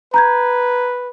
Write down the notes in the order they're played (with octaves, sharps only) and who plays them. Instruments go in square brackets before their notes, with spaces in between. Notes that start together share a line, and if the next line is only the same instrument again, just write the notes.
[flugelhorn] B4 [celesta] A#5 G6 G#6